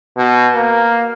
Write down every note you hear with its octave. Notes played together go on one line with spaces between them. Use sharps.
B2
A#3